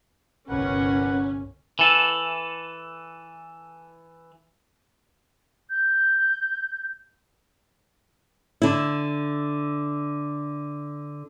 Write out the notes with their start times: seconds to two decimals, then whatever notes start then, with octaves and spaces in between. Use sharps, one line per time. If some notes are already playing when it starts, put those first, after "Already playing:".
0.49 G1 C2 C#4 A#4 B4 F#5
1.79 E3 A4
5.70 G6
8.62 D3 E4